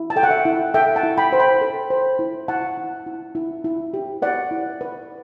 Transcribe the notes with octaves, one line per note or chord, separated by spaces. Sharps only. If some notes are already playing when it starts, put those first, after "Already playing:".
Already playing: E4
A5
A4 G5
F#5
E5
E4
A4 E5 G5
F#5 A5
E4
G5 B5
C5
G5 B5
A4
C5
E4
E4 F#5 A5
E4
E4
E4
E4
G4
B4 D5 F#5
E4
B4